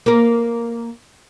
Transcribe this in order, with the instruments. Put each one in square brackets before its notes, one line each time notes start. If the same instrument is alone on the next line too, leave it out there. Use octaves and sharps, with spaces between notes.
[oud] A#3 A#4